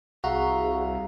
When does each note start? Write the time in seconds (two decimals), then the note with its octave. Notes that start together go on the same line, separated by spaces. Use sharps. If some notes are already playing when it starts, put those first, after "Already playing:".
0.24 C2 F#4 G#4 E5 F5 A#5